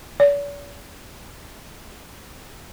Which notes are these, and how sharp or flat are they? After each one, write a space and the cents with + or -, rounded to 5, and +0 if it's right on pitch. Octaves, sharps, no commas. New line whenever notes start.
D5 -45